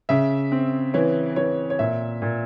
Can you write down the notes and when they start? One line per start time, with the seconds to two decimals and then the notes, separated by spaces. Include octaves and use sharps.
0.09 C#3 E5
0.52 C4
0.94 E3 C#5
1.36 E3 C#5
1.70 C#5
1.79 A#2 E5
2.22 A#2